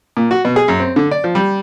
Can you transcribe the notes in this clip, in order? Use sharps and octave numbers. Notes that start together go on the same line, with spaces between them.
A#2
F#4
B2
G#4
F#2
C4
D3
D5
F3
G3